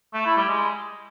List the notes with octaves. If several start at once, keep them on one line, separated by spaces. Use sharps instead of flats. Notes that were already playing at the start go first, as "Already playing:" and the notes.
A3
E4
G3
G#3